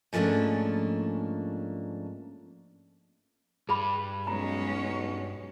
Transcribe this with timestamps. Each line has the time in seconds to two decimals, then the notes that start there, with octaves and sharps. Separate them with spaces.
0.13 G#2 F3 A3 A#3 C#4 D4
3.69 G2 G#4 B5
4.27 B1 G#3 C#4 A#5